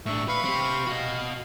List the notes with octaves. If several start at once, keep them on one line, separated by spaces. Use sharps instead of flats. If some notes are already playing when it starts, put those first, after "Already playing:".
A2 D4 E5 C#6
B4 F5 B5 C#6
C4 G4
F#4 D#5 F5
F5